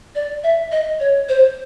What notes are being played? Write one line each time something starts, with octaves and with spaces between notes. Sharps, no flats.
D5
E5
D#5
C#5
C5